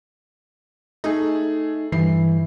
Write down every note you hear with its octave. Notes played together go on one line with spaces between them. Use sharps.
A3 D#4 G#4
G2 E3 C7